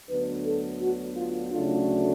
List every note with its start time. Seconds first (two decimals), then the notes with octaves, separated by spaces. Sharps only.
0.09 D2 D3 F#3 B3 D4 B4
0.46 A4
0.80 F#4
1.17 F4
1.53 D2 C#3 F#3 A3 D4 F4